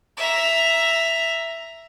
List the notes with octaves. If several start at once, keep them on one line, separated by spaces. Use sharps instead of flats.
E5 A#5